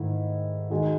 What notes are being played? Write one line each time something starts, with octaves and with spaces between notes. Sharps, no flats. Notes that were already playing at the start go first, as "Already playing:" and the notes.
Already playing: G#2 D#3 A3 E4
D#3 G#3 D#4 F#4